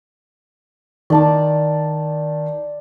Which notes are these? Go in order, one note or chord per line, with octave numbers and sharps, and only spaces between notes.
D#3 D5 A5 D6